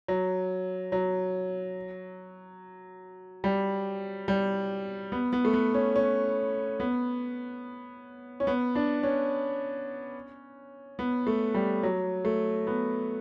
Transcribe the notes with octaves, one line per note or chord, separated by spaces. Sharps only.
F#3
F#3
G3
G3
B3
B3
A3
B3
C#4
C#4
B3
C#4
B3
D4
C#4
B3
A3
G3
F#3
A3
B3